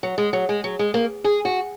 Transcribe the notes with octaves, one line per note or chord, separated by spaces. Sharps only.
F#3
G#3
F#3
G#3
F#3
G#3
A#3
G#4
F#4